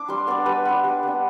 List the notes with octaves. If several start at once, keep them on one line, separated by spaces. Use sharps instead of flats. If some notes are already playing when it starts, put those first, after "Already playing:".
Already playing: D4 D6
G3 C6
B3 D4 D5
G3 B4
B3 D4
G3
B3 D4